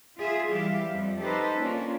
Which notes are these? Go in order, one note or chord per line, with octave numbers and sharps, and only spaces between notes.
F4 G#4 E5
E3 G3 G4 E5 F5
F2 F3 G3
D#4 G4 A4 B4 C5
A#3 C#4 D4 F4